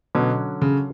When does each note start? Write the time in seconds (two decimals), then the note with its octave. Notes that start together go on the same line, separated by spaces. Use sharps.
0.15 B2 D3 F#3 C#4
0.62 C#3